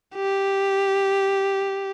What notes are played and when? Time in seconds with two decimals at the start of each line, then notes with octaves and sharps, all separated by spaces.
0.16 G4